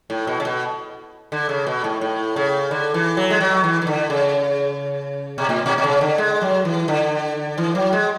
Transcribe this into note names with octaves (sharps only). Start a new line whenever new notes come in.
A2
B2
C#3
B2
D3
C#3
B2
A2
A2
C#3
D3
E3
F#3
G#3
F#3
E3
E3
D3
C#3
B2
A2
B2
B2
C#3
D3
G#3
F#3
E3
D3
E3
F#3
G#3